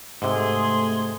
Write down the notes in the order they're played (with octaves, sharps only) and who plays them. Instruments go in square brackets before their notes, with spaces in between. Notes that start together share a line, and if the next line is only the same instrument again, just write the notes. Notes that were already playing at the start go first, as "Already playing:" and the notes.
[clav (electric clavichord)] G#2 C3 [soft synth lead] A3 [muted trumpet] G#4 [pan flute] C6